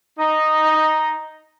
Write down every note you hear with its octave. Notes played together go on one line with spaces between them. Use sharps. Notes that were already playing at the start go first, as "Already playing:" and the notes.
D#4